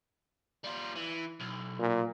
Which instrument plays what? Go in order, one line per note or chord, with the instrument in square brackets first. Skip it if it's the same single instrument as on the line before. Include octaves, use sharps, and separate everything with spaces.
[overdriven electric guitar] G3 F4
E3
B1
[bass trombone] A#2